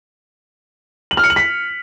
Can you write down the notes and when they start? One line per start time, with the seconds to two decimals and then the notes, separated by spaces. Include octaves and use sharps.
1.11 F#7
1.17 F6
1.24 C#7
1.30 F#7
1.36 B6